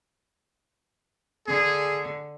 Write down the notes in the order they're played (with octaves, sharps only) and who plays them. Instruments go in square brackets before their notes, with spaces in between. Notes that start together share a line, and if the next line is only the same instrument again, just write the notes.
[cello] D3 [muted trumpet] G#4